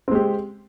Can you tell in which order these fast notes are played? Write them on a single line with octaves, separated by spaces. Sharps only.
C4 G#3 G4